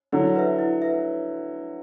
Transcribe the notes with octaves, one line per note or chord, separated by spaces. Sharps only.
D3 F#3 E4
B4 E5
E4
B4 E5